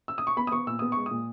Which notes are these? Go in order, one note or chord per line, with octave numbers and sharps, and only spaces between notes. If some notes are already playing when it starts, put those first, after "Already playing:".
E6
D#6
C#6
B3 B5
D#6
B3 C#6
A#2 E6
B3 D#6
G#3 C#6
D#6
A#2